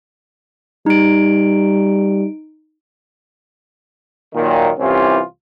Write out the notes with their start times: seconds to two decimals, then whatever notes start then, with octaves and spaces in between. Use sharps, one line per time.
0.86 G3 D#4 D7
4.34 A#2 D#3 F#3
4.78 C2 E3 C4 C#4 F4 G4